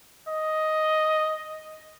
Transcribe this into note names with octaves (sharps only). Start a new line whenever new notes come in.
D#5